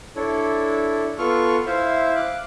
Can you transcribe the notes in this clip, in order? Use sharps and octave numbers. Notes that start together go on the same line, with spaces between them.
D4 E4 A4 C#5
B3 F4 A4 C#6 F6
E4 C5 E5 F5
F5 D6 F#6